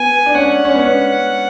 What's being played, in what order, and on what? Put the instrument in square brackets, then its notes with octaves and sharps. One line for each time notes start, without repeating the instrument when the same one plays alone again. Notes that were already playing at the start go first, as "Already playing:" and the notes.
Already playing: [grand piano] B3 [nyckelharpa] G#5
[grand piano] D4
[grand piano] C#4 [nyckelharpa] F#5
[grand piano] C#4
B3
C#4